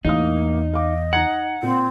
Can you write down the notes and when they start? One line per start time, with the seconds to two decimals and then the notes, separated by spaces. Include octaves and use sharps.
0.05 A1 E2 A#3 D#4 F5 D#6
0.73 D#5 F5 D6
1.13 D#4 F#5 A#5 G#6
1.63 A#2 C4